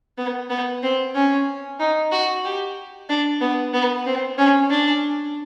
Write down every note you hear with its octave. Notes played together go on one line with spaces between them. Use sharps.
B3
B3
C4
C#4
D#4
F#4
G4
D4
B3
B3
C4
C#4
D4